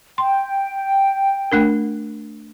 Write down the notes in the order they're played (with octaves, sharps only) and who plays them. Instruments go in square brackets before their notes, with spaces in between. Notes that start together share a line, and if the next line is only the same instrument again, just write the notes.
[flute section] G5 [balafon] C6
[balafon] A3 D4 A#4